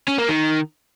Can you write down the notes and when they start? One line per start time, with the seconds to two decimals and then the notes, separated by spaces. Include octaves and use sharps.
0.08 C#4
0.18 A#3
0.29 D#3